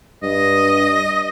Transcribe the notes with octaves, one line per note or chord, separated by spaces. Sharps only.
G2 D#5